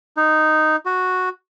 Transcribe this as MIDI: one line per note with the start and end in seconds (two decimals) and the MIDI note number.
0.17 0.76 63
0.86 1.29 66